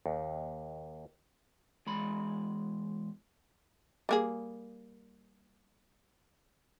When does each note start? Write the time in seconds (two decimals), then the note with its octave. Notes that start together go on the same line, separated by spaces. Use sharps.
0.06 D#2
1.87 E2 G#3 B5
4.09 G3 A#3 G#4